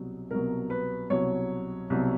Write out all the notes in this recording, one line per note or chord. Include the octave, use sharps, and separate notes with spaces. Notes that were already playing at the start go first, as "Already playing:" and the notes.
Already playing: C2 B2 F#3
C2 B2 F#3 A#4
B4
C2 B2 F#3 C#5
C2 B2 F#3